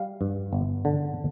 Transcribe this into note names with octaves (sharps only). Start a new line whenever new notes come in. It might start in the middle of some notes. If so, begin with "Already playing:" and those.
Already playing: G3 F5
G2
G1
D3